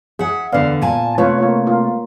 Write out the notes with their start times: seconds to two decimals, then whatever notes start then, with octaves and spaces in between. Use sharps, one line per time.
0.19 G#4 E5 F#5
0.52 E2 D3 B4 D5 F5
0.82 A#2 G#5 A5
1.18 C3 A3 F4 B4 C#5
1.38 A#3 F4 C#5
1.67 A#3 F4